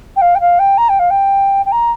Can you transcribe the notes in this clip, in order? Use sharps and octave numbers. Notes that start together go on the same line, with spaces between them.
G5
F5
G5
F5
G5
A#5
G5
F5
G5
G5
A#5